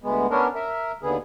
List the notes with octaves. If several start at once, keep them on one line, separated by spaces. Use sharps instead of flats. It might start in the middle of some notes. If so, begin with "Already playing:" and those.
D2 G#3 B3
B3 C#4 D4 A#4
A#4 E5
D#2 D3 B3 G#4